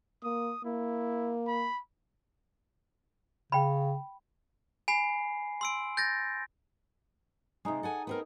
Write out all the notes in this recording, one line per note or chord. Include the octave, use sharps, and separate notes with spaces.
A#3 D#6
A#3 E4
B5
C#3 G5 B5
G#5 B5 C7
C6 E6 D7
G6 A6 A#6
C3 G#3 D#4 G#4
A4 F#5 G#5
B3 C4 A#4